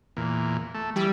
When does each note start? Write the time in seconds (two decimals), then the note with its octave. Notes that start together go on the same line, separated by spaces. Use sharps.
0.17 E2 A#2
0.74 A3
0.96 E3 G3